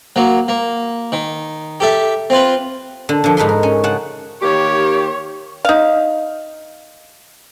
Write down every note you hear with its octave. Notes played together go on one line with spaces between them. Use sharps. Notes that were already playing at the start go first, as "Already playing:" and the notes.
F#3 A#3
A#3
D#3
G4 A4 E5
C4 F4 B4
D3
D3 F3
G#2 D#4 B4 C6
A#4
C#4
C#3 F#5 A5
D#3 A#3 G4 C#5
D#4 F5